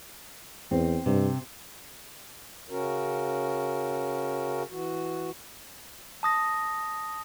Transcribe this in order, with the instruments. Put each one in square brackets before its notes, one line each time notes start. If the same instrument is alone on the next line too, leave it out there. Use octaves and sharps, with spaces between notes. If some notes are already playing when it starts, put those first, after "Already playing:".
[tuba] E2 [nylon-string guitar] C4
[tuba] G2 [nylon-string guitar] C3
[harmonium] C#3 C#4 F#4 A#4
E3 F#4
[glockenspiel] A5 D#6 A#6